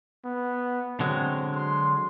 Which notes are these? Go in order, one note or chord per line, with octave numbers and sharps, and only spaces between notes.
B3
D3 F#3 G#3 C4
C6